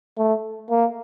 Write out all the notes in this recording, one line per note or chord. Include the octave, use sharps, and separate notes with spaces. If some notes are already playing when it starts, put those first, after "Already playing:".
A3
A#3